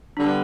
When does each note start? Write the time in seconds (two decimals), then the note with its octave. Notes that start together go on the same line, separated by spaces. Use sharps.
0.17 D3 G3 B3 D4